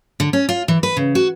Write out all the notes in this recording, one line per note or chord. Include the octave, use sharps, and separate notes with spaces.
D3
C#4
F4
E3
B4
C#3
F#4